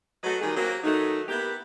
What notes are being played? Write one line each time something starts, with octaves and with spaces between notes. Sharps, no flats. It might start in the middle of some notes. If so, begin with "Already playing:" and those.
F#3 A3 F#4 G#4 B4 D#5
D#3 F#3 G3 G#4
F#3 A#3 C4
D#3 F#3 A3 D#4
A#3 B3 E4 G4